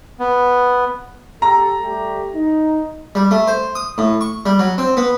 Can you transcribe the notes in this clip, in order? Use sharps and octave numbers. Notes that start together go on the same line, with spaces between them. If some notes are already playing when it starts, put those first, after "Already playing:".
B3
G4 A4 A#5
G3 A3 G4
D#4
G3
A3
C5
D#6
A2
C#6
G3
F#3
C4
B3